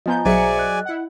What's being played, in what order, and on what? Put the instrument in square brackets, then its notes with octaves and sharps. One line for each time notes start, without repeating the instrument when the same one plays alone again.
[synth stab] F3 B3 G6 [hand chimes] D#5 G#5 A#5
[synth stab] B1 C#7 [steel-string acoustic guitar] F#3 G#4 E5 [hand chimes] C5 [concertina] D5 G#5
[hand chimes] D#5 F#6
[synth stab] E4 F#5